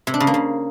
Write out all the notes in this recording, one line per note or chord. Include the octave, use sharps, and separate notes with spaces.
C3
D4
C#3
A#3
C#3